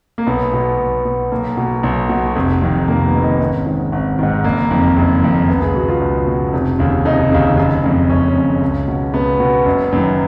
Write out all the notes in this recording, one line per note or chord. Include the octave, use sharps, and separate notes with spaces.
A#3
B1 B3
B2
B1
B2
B1 A#3
B2
B1
B2
F1
F2 D#3
F1 A#3
B3
F2 D#3
D#4
G#1 C#4
G#2 D#3
G#1
G#2 D#3
F#1 A#3
F2 D#3
F#1
F2 D#3
C#2 B3
G#4
B2 F#4
F4
C#2
B2
F1
D#2 C#3
F1 D#4
D#2 C#3
F#1
F2 C#3
F#1 C#4
F2 C#3
C#2
B2
C#2 B3
B2
F#1
F#2 D#3